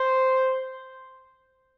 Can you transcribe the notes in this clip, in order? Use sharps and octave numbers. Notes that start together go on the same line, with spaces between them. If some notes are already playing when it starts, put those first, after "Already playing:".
Already playing: C5